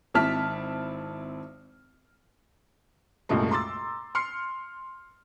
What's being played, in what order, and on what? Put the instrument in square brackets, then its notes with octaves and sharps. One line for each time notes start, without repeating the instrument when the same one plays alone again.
[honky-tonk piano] G#1 C4 E4 A5 F6 B6
[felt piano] C2 F#2 A#2 G#3 A3
A#5 C6 D6 E6 A6
C6 F6 C7 C#7